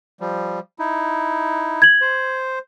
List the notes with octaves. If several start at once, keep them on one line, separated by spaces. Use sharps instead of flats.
F3 G3
D#4 E4
G#6 F#7
C5